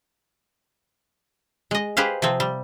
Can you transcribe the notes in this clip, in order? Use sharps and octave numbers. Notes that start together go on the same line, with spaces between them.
G#3 D#5
G4 G#4 B4 C5 F5
C3 F3 C4
G3